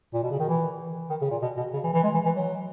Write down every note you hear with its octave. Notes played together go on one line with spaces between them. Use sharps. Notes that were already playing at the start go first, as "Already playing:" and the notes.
A#2
B2
C#3
D#3
E3
D#3
C#3
A#2
B2
B2
C#3
E3
E3
G#3
E3
E3
F#3